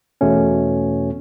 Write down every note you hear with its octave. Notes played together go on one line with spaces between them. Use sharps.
E2 B2 A3 C#4